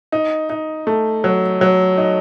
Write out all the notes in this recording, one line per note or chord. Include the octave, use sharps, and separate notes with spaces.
D#4
D#4
A3
F#3
F#3
D#4